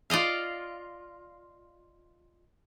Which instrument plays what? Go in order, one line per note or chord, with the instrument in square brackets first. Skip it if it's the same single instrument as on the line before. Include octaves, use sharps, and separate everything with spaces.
[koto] F4 D5 D#5 F5